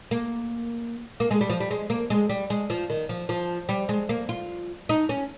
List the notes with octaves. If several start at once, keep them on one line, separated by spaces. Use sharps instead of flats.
A#3
A#3
G#3
G3
F3
G3
G#3
A#3
G#3
G3
G#3
F3
D#3
F3
F3
G3
G#3
A#3
F4
D#4
C#4